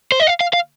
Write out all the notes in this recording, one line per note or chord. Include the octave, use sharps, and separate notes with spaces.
C5
D#5
F5
F5
F5